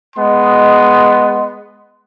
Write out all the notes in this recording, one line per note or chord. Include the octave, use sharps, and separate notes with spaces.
G#3 B3 D#5 C6